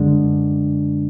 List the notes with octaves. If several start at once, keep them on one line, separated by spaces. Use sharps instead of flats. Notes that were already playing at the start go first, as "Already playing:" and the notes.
Already playing: F#2 D3 G#3 D4